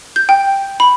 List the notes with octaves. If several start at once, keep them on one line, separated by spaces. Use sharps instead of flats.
G6
G5
B5